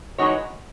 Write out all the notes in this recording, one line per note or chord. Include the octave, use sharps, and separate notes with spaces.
E3 G#3 D#4 F#4 C#5